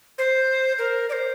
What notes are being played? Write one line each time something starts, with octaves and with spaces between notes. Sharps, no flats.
C5
A#4
D5
C5